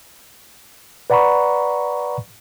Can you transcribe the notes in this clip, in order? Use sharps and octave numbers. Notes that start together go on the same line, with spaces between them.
B4 D5 F#5 A#5 B5 C#6